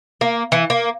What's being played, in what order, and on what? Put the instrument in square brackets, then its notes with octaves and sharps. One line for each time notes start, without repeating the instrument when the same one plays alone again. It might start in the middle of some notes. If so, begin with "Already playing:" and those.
[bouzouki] A#3
E3
A#3